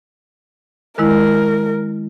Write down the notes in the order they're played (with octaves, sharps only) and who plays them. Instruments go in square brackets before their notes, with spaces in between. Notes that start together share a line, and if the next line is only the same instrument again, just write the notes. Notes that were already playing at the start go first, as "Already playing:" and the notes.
[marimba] D#3 G#3 E4 [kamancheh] A#4